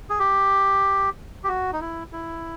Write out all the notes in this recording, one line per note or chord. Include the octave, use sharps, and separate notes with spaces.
G#4
G4
G4
F#4
D#4
E4
E4